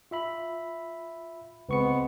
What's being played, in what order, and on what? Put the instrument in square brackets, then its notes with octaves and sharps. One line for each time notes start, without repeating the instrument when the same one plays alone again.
[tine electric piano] F4 E5 B5
[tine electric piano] C#2 C#6 C#7 [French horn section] G#3 B3 C4